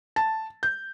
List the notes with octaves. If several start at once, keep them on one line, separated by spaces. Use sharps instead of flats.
A5
G6